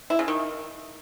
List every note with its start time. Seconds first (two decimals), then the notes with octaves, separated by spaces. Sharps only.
0.10 E4
0.19 C#3
0.28 D#3